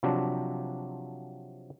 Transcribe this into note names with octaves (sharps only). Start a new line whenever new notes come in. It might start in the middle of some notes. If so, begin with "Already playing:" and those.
C3 F3 F#3 C4 D4